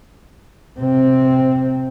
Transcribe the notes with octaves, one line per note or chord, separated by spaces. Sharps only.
C3 C4